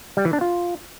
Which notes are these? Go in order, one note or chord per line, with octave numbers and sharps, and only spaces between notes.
G3
E3
D4
F4